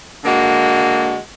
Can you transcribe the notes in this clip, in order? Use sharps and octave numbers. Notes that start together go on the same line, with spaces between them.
D3 G#3 A#3 F#4